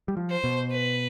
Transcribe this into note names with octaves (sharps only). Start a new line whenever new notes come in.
G3
F3
C5
B2
B4